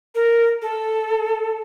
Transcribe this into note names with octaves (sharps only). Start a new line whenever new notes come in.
A#4
A4